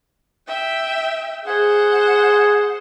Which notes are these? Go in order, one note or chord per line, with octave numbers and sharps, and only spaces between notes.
E5 G5
G#4 C5 F#5